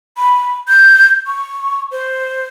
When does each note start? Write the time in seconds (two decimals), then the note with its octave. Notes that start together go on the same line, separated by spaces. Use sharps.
0.17 B5
0.68 G6
1.27 C#6
1.91 C5